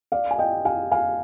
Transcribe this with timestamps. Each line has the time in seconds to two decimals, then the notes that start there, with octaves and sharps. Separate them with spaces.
0.12 D5 F5
0.31 G#5
0.38 D#5 G5
0.65 F5 G#5
0.92 F5 G#5